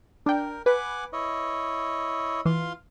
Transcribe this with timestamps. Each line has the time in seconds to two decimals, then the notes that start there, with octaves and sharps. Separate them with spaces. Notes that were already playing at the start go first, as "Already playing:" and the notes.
0.26 D4 A#4 G5
0.66 B4 F#5 G#5 D6
1.13 E4 C#5 D#5
2.45 E3 F4 F5 C6